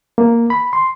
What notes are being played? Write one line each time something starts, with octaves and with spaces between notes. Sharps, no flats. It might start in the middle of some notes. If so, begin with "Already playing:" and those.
A#3
B5
C6